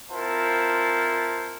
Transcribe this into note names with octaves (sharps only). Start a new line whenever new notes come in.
C4 E4 F4 A#4 C5 A5